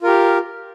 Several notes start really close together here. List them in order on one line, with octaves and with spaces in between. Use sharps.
F4 A#4 G4